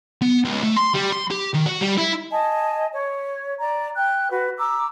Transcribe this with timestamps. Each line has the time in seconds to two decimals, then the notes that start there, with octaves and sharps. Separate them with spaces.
0.22 B3
0.44 C#2
0.63 A3
0.77 C6
0.95 G3
1.13 C6
1.31 G4
1.54 D#3
1.66 F#4
1.81 G3
1.97 E4
2.31 D#5 G#5 A5
2.92 C#5
3.58 D5 A#5
3.95 G5 F#6
4.29 F#4 B4
4.58 A#5 D6 E6